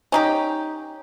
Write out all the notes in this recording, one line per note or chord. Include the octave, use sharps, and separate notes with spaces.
C#4 D#4 G4